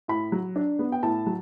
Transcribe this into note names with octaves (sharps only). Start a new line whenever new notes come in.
A2 B5
F#3
D4
B3
G5
A2 A5
F#3